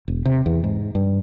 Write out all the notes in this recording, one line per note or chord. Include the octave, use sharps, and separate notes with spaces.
E1
C3
E2
G#2
G2